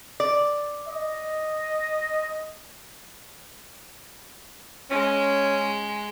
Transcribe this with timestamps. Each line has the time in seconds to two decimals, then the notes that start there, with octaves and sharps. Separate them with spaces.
0.20 D5
0.88 D#5
4.91 G#3 C#4